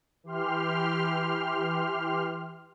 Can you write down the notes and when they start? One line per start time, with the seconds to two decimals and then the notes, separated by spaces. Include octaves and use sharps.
0.24 E3 G4 C6 F6